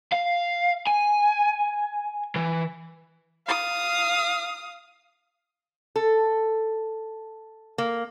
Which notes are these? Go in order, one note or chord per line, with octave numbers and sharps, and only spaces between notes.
F5
G#5
E3
F5 D#6
A4
A#3